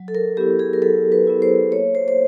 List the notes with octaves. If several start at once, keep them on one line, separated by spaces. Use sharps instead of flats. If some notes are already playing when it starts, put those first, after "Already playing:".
Already playing: F#3
A4
A#4
B3 E4 G4
G#4
A#4
F#3 A4
B4
B3 E4
C5
A#3 C#5
C5
C5